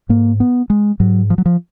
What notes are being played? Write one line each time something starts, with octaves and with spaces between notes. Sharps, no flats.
G#2 A#3
B3
G#3
G#2 F#3
F3
F#3
F3